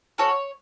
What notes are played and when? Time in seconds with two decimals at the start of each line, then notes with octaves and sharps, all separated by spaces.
0.18 C#4 F#4 A4 C#5